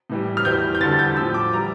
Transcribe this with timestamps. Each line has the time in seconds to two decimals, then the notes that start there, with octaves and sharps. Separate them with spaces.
0.10 A2 E3 G3
0.37 F6
0.45 E2 E3 G3 G6
0.75 G6
0.81 E2 D3 G3 A6
0.99 G6
1.17 A2 F3 E6
1.34 D6
1.53 E3 G3 A#5